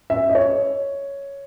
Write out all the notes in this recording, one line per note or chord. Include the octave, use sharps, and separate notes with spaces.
E5
D#5
C#5